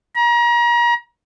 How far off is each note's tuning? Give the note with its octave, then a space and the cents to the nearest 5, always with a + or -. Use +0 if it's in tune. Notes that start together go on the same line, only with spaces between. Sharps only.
A#5 +35